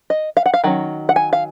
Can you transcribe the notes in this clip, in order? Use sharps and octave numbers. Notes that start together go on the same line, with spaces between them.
D#5
F5
F#5
F5
D#3 F#3 C#4
F#5
G#5
F5